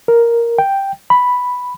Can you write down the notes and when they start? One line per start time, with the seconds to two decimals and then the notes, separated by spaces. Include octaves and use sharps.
0.08 A#4
0.58 G5
1.10 B5